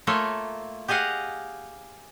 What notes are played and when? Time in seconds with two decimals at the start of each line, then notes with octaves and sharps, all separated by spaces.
0.07 A3 A#3 F4 C#5 E5
0.88 G4 G#4 D#5 F5 F#5